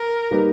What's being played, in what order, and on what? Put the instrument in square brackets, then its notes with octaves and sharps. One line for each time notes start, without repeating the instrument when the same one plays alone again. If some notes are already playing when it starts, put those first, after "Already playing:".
Already playing: [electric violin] A#4
[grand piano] G3 A#3 D#4 G4 B4